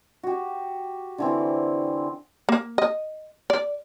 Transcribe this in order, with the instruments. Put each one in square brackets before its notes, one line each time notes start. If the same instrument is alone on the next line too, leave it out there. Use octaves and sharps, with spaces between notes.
[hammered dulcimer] F#4 G4
D3 E3 C4
[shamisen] A#3
D#5
D5